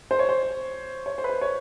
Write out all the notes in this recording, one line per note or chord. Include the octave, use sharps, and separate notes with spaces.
C5
C#5
C5
C#5
C5
B4
C5
C#5